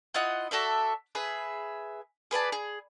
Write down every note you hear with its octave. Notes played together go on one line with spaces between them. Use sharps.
E4 F4 D#5 F#5
F#4 A4 D5 E5
G#4 B4 E5
G#4 B4 D5 A5
G#4